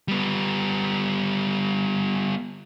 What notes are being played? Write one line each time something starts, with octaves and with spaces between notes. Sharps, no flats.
G3 B3